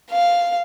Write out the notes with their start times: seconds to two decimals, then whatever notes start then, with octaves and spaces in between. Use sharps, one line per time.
0.11 F5